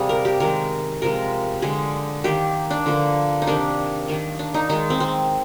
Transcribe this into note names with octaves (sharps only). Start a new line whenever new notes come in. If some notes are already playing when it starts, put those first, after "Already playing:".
Already playing: C3 G3 A#3 G#4
A#4
G4
D#3 G#3 A#4
C3 F3 G#3 A#4
D3 G#3 G#4
D#3 A#3 G4
D4
D3 F3 A#3
D#4
C3 D#3 A#3 D4
D#3 A#3
D4
D#4
D#3 G#3 D#4
C4
C4